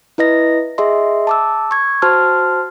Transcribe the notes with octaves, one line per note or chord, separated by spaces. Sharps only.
E4 B4 D#5 A#6
G#4 D#5 E5 C6
A5 D6 E6
C#6 G#6
F#4 C5 A5 C6 F6